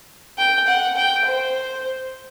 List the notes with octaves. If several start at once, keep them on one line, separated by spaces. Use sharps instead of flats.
G5
F#5
G5
C5